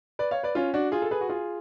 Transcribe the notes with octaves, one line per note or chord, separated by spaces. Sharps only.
B4 D5
C#5 F5
B4 D5
C#4 F4
D4 F#4
F4 G#4
A4
G#4 B4
F#4
F4 G#4